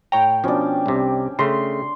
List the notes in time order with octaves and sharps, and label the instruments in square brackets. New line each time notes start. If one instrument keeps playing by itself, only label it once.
[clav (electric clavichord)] A2 C#5 A#5 [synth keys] G5
[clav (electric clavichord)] B2 F3 [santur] C#4 D4
[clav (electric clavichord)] C2 C3
[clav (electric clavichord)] C#3 A3 [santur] C6